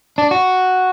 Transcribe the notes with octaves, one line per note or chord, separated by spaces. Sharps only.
D4
F#4